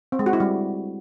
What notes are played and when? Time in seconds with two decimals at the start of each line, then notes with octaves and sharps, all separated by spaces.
0.12 C4
0.19 G#3
0.26 F#4
0.33 E4
0.40 G3